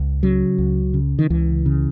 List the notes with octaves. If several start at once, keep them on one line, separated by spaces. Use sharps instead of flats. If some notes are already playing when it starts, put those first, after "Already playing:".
Already playing: C#2
C#3 F#3
C#2
C#3
D#3
C#2 E3
C#3